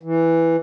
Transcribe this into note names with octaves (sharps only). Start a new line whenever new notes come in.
E3